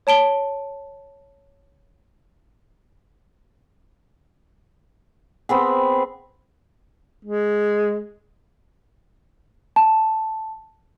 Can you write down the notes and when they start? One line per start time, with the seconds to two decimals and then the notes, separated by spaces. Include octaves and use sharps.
0.07 C#5 A5 D7 G7
5.49 B3 C4 G#4
7.25 G#3
9.76 A5